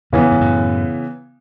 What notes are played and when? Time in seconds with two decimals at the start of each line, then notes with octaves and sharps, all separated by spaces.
0.12 E2 G2 C#3 E3 B3
0.32 G2
0.41 F#2 A2